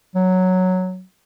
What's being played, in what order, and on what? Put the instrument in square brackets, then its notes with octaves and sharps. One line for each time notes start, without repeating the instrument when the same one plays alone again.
[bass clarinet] F#3